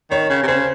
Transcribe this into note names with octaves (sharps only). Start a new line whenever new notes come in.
D#3 C#5
C#3
C3
C#3 C5